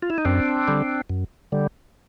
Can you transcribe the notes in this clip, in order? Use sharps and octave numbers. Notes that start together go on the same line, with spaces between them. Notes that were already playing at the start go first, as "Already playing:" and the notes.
F4
E4
D#4
F#2 C4 D4
D3 G3
F#2
D3 G3